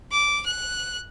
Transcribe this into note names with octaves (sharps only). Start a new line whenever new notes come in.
D6
F#6